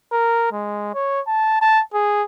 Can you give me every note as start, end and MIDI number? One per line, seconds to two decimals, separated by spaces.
0.12 0.48 70
0.52 0.93 56
0.94 1.20 73
1.27 1.60 81
1.61 1.81 81
1.94 2.23 68